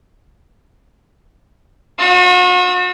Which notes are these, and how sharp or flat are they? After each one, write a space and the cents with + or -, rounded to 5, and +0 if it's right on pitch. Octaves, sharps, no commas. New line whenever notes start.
F#4 -40 E6 -20